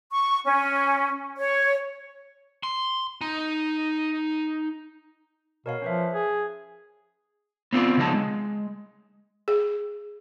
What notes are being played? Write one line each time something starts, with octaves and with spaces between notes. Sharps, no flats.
C#6
C#4
C#5
C6
D#4
B2 A#4 C#5 F5
F3 C#4 B4 E5
G#4
B3 C4 F4 A4 D5
C#3 F3 G#3 D#4 A5
G#3
G#4